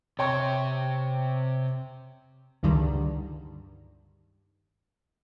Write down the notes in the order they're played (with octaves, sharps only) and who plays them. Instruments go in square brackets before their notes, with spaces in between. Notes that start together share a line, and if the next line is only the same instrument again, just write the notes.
[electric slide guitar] C3 [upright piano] C#5 G5 C#6
[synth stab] C#2 G2 D3 D#3 G3